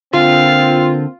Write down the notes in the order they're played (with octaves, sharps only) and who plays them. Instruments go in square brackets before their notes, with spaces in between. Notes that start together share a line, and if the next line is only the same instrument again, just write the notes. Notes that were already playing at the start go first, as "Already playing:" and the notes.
[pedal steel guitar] D3 [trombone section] A#3 C4 [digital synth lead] F4 [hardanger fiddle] F5